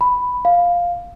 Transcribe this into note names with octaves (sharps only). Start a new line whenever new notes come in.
B5
F5